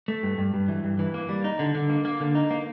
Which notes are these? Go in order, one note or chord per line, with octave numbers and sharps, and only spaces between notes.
A3
G2
G2
G2
E3
G2
E3
A#3
G3
D#4
D3
D3
A#3
A#3
D3
D#4
A#3